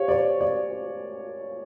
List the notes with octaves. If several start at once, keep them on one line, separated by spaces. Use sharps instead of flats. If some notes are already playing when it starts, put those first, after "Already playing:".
Already playing: G4 C5 C#5 F5
D5
C#5
D5